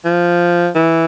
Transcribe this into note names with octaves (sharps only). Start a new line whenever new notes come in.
F3
E3